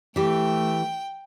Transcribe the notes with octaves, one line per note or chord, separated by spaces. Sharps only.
E3 A3 G4 G5